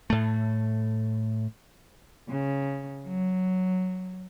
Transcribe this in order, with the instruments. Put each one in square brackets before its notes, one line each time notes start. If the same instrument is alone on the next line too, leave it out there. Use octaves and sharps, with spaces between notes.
[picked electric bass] A2 A3
[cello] C#3
F#3